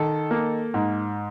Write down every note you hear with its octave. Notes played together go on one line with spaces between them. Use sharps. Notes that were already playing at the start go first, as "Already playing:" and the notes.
Already playing: D#3 A4
A#3
G#2